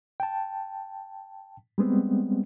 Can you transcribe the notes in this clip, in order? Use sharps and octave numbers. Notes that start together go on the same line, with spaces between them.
G5 A5
G3 G#3 B3 C4